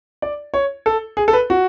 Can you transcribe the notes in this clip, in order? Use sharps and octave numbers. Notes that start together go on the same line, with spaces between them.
D5
C#5
A4
G#4
A4
B4
F#4